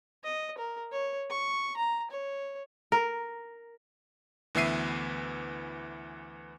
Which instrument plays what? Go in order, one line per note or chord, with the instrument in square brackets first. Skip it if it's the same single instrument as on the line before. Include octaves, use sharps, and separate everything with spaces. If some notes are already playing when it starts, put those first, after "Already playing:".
[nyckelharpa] D#5
A#4
C#5
C#6
A#5
C#5
[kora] A#4
[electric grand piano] D2 E3 B3 E5 C7 D#7